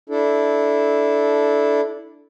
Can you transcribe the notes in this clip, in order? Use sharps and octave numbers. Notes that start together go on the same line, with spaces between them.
D4 E4 A4